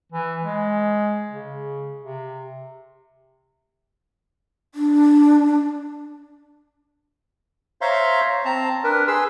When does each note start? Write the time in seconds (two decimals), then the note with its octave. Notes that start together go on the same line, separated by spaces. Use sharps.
0.12 E3
0.44 G#3
1.31 C#3
2.01 C3
4.75 D4
7.81 C5 C#5 E5 F5 A#5 C6
8.45 C4 A5 A#5
8.84 D4 A#4 B4
9.07 G#4 B4 C6 E6